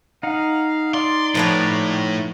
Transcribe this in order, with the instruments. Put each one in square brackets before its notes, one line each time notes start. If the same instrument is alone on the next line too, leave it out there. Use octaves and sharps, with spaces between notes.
[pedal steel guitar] D#4 F#5 [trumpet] F5
[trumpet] D5 [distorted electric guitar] C6
[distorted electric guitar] A2 A3 [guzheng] F3 B3 C#5